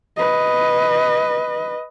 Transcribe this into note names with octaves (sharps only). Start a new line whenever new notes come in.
B4 D#5